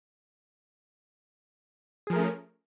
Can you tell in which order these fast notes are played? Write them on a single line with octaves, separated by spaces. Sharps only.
G#4 F3 A#4 A3 C#4